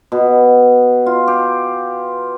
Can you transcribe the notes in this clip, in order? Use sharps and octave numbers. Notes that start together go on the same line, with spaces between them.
B2
F4
G4